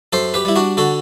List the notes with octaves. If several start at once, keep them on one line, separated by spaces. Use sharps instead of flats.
F#2 A4 C5
G4 B4
G3 E4
D4 F#4
D3 F#4 A4